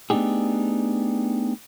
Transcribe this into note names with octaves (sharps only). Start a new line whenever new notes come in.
A3 B3 D4 D#4 G4 G#4